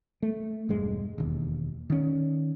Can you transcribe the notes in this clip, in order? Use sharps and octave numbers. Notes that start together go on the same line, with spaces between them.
A3
E1 G2 G#3
E1 D#2
D#3 C#4